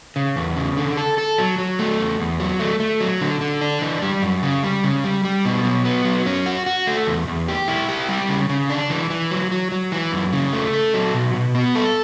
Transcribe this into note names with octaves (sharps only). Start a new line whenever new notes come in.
C#3
E2
C#3
D3
A4
A4
F#3
F#3
A3
E2
E2
F#3
A3
A3
F#3
D3
D3
D4
E3
G3
F#2
C#3
G3
C#3
G3
G3
B2
F#3
B3
F#3
C#4
F#4
F#4
A3
E2
E2
G4
E4
G4
G3
C#3
C#3
D4
E3
E3
F#3
F#3
F#3
E3
F#2
C#3
A3
A4
F#3
B2
B2
B3
A4